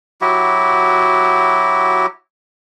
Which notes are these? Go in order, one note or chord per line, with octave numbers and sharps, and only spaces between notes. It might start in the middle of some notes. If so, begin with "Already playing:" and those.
F#3 E4 F#4 G4